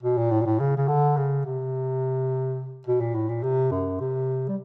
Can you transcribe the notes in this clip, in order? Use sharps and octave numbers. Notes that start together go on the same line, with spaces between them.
B2
A#2
A2
A#2
A2
C#3
C#3
D3
C#3
C3
B2
A#2
A2
A#2
C3
F#2
C3
G3